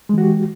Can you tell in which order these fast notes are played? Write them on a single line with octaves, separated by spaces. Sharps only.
G#3 E3 F#4 G4